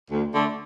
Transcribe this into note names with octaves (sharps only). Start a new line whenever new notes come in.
D2
D3 A3